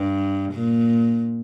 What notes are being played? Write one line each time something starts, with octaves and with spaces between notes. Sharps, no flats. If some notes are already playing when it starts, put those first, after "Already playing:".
Already playing: G2
A#2